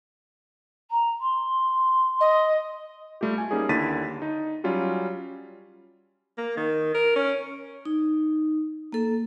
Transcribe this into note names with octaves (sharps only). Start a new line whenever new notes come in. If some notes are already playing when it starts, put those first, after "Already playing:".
A#5
C6
D#5
G3 A3 F4 G4
G#5
G3 A#3 C#4 D#4 G#4
D#2 D3 E4 A6 B6 D#7
D#4
F#3 G3 C#4 F4
A#3
D#3
A#4
C#4
D#4
A#3 A4